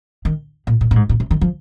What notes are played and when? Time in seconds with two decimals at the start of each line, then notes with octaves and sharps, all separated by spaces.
0.25 D#3
0.67 A#2
0.81 A#2
0.91 A#2
0.96 G#2
1.09 A#2
1.20 C3
1.31 D#3
1.41 F3